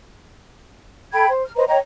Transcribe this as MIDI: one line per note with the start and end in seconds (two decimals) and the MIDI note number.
1.13 1.28 69
1.13 1.28 79
1.13 1.28 83
1.13 1.28 92
1.28 1.42 72
1.44 1.53 89
1.56 1.66 71
1.56 1.66 72
1.56 1.66 75
1.56 1.66 82
1.68 1.77 73
1.68 1.77 75
1.68 1.77 79
1.68 1.77 82